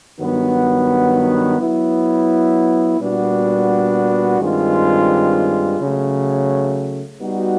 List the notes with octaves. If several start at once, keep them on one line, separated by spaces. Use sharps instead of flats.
G2 D#3 F#3 B3
F#3 B3 E4
A#2 G3 B3 D4 F#4
G2 D#3 G#3 C4 F4
C#3 F#3 A3
G3 B3 D#4 F#4